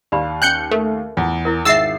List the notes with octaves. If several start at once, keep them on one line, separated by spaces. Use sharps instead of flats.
D#2 G4 D5 F5 B5
C#4 G#5 F#6 G6 C#7
A3 A#4
E2 F4
E4 A#4
G#1 G#4 E5 E6 A6 C7